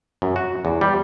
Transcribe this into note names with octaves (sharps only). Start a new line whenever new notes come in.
F#2
F#4
E2
G3